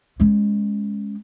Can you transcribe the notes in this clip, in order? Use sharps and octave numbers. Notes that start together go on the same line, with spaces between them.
G#3 C#4